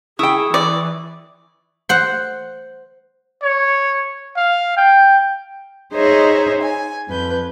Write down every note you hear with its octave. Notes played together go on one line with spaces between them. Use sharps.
E4 G#4 G5 C#6 D#6
E3 D5
C5 F#5
C#5
F5
G5
D#4 G#4 C5 C#5 D#5 E5
G#5
F2 B4 G6